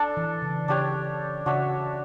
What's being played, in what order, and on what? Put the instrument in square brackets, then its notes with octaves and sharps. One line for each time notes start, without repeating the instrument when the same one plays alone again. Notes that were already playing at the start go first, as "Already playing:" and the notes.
Already playing: [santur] D4 A4 D5
[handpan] E3
C#3
[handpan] C#3 [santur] D4 G4 C#5
[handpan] C#3 [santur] D4 F#4 C#5 E5